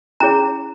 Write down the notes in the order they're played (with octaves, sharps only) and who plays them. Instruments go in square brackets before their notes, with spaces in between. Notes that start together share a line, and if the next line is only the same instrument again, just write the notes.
[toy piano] C#4 E4 G#4 C#5 A#5